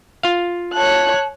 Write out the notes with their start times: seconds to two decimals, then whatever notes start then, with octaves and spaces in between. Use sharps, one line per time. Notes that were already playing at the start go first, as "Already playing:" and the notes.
0.23 F4 F5
0.74 C#5 A5 F#6